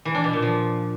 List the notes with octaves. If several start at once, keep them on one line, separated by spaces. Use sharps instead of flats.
E3
D4
B2
A#2
F3